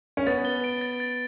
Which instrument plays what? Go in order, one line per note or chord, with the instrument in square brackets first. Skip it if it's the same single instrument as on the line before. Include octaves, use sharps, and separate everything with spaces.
[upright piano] C#4
[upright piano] B3 [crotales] A6
[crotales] G7
D7
A6
A6